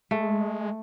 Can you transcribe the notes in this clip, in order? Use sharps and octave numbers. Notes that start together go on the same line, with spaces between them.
G#3 A3